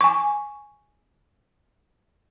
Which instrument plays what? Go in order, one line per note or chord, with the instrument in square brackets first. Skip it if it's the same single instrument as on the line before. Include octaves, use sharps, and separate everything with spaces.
[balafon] G#5 C#6